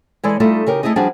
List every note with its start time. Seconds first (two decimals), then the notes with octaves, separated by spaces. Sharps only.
0.24 E3 G#3 A4 D5
0.40 G3 A3 D#4 F4 A4
0.66 C#3 D#4 G4 A#4
0.83 A3 D#4 E4 G#4 D#5
0.96 F3 G3 D4 F#4 G#4